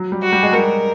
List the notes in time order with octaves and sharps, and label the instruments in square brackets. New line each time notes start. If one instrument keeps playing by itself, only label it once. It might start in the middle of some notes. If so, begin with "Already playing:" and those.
Already playing: [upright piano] F#3
G3
[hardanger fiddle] F#4
[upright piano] G3
G#3
[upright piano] G3 [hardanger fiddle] A#4